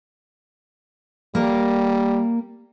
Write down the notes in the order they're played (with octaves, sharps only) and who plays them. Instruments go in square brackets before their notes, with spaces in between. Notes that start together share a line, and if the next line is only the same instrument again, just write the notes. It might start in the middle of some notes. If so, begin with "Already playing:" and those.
[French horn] G3 [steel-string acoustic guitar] A#3 A#4